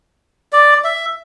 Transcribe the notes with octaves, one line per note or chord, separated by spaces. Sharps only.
D5
E5